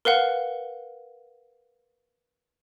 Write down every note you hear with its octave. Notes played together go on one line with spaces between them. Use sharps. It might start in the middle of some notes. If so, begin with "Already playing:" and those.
A#4 B4 F5 F#5